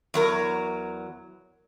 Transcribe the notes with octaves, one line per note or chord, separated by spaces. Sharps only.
E2 F#3 A#4